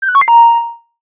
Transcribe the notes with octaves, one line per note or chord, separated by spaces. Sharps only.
G6
F#6
C#6
C7
A#5